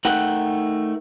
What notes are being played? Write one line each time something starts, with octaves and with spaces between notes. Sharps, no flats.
A3 D#4 A#4 F#5 G5